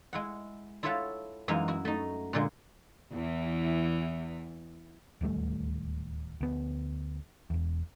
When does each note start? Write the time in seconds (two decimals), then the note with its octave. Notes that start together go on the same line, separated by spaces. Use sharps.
0.13 G#3 E4 F#5
0.83 E4 F4 A4 C#5 E5 F#5
1.48 F#2 E3 G#3 D#4 G#4 F5
1.68 E4 F#4
1.85 A3 D#4
2.33 A#2 D3 G#3
3.13 E2 E3
5.21 D1 D#2 G3 A3
6.41 D2 B3
7.50 E1 E2